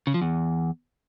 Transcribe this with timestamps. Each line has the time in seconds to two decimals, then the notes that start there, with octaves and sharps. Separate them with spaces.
0.07 C#3
0.14 F3
0.22 E2